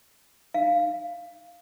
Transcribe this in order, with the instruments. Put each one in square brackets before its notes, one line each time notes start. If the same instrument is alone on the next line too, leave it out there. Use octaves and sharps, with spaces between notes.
[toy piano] F5